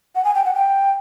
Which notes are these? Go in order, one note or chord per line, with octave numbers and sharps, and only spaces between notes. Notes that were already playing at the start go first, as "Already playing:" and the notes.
F#5
G#5
G5
F#5
G5